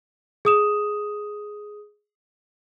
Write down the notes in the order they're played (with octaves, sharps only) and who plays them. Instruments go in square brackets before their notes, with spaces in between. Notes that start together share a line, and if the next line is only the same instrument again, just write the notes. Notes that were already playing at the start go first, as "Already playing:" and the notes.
[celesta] G#4 D#6 E7